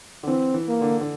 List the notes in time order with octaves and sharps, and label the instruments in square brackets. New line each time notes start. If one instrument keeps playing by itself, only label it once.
[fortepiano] D3
[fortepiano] E3 [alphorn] C4
[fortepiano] E3
[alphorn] A#3
[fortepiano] D3
D3